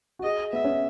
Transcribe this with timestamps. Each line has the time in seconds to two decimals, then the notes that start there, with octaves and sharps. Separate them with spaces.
0.19 F#4
0.23 G#4 D#5
0.52 B3 E5
0.65 C#4